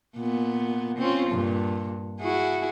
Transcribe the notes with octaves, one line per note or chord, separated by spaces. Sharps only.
A#2 B3
C4 C#4 F4
G2 A#2
E4 F#4 G#4